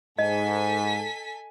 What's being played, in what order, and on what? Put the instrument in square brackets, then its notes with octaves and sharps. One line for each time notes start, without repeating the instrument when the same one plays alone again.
[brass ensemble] G#2 [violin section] A4 G#5 B6 [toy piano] D#5